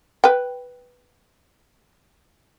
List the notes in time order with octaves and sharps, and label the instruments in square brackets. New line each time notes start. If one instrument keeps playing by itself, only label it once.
[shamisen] B4 G5